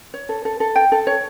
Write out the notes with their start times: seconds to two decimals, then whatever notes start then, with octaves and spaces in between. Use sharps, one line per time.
0.14 C#5
0.29 A4
0.45 A4
0.60 A4
0.76 G5
0.92 A4
1.07 C#5